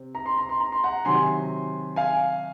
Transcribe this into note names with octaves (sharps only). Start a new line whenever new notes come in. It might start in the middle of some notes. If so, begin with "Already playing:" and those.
Already playing: C3 C4
A#5
C6
A#5
C6
A#5
C6
F#5 A#5
C3 D#3 F#3 G#5 C6
F5 G#5